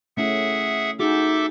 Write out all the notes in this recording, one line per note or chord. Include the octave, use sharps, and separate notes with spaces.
A3 C#4 E4 G#4 E5 F#5
D#4 F#4 G#4 A4 E5 D6